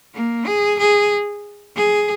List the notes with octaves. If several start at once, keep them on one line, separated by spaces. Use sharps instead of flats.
A#3
G#4
G#4
G#4